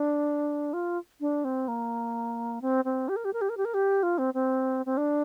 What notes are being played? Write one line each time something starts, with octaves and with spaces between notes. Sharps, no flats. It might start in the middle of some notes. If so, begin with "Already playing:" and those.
Already playing: D4
F4
D4
C4
A#3
C4
C4
G4
A#4
G4
A#4
G4
A#4
G4
A#4
G4
F4
C4
C4
C4
D4